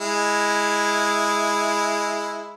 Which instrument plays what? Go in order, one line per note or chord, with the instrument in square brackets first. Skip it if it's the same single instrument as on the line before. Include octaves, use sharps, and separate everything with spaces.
[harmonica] G#3 E4